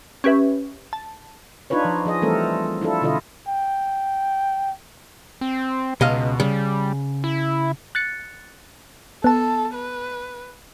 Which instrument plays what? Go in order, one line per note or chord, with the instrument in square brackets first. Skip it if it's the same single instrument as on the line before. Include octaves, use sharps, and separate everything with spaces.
[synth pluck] C#4 G4 B4 E5
A5
[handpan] D4 D#4 F4 B4 C#5
F3
F3 G#4 D#5
E3 G3 A3 C4 A4 A#4
D4 E4 F4 A4
B2 D3 E4 F4 A4 D#5
[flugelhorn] G5
[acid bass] C4
[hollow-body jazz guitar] C#2 D#5 F5 [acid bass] B2
[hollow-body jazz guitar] C#3 [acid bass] G3
[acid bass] E4
[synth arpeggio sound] F#6 A6 C#7
[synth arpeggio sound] B3 A5 [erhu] A4
[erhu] B4